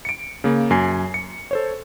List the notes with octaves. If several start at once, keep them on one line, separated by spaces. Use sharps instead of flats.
C#7 D7
C#3 A#3
F#2 G#5 C7
C#7
A4 C5 C#5